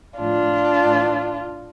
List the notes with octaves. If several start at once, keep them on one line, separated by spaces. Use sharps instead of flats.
A2 F3 D4 F4
A2 E3